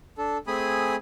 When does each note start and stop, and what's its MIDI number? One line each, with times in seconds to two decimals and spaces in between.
0.18 0.38 62
0.18 0.38 69
0.47 0.96 57
0.47 0.96 60
0.47 0.96 68
0.47 0.96 80
0.47 0.96 83
0.47 0.96 87